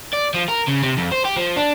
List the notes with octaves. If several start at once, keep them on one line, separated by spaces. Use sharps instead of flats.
D5
F3
A#4
C#3
C3
F2
C5
G4
F3
D4